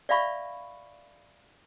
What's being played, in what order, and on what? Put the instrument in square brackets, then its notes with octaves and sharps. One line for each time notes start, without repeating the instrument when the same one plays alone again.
[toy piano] D5 E5 F5 B5 C#6